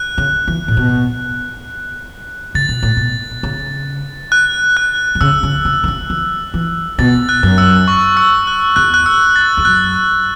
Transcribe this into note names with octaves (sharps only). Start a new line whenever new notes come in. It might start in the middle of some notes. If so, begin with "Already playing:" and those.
Already playing: F#6
C#3
E3
A2
B2
C#3 A6
B2
A2
B2
C#3
F#6
F#6
E3
C#3 E6
C#3
C#3
E3
C#3
E3
E3
B2 A6
F#6
F#2
E6
C#6
E6
F#6
E2 F#6
F#6
E6
A6
E2
F#2 F#6